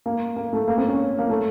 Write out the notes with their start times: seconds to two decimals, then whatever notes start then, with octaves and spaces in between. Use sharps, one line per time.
0.06 A#3
0.36 A#3
0.53 A3
0.68 A#3
0.77 C4
0.88 C#4
1.19 A#3
1.29 A3